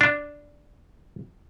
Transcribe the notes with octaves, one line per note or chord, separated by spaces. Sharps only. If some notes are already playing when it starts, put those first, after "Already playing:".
D4